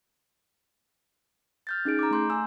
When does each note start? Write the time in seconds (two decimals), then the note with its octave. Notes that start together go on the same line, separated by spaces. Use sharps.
1.67 F6 G6 A6
1.85 C#4 D#4 G#4 D7
1.99 A#5 D6
2.11 A3 C6 G6
2.30 G#5 E6